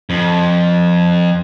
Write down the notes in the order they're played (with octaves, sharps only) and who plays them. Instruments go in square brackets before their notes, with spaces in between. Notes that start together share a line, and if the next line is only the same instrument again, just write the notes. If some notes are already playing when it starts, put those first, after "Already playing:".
[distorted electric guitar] F2